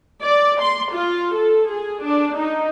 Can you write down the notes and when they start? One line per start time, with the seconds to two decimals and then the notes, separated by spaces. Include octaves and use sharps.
0.23 D5
0.61 C6
0.93 F4
1.35 A4
1.69 G#4
2.03 D4
2.38 D#4